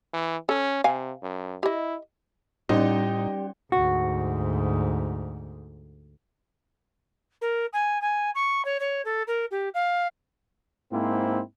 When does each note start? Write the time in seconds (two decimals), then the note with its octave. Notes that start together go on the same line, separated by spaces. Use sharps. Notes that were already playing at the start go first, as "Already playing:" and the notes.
0.13 E3
0.49 C#4 A4
0.84 C3 F5 G#5
1.22 F#2
1.63 E4 G4 D#5
2.69 A2 G3 C#4 D#4 G4 D5
3.72 D2 G#2 F#4
7.41 A#4
7.73 G#5
8.01 G#5
8.35 C#6
8.65 C#5
8.80 C#5
9.05 A4
9.27 A#4
9.51 G4
9.74 F5
10.92 G#2 A#3 C4 E4